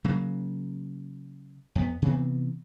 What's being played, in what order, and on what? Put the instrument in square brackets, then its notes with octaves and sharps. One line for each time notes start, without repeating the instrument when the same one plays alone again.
[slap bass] C#3 F#3 A#3
F2 B3
C3 E3 B3 C4